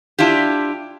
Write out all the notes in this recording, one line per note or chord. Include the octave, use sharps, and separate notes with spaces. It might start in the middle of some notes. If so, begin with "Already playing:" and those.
D4 E4 F4 G4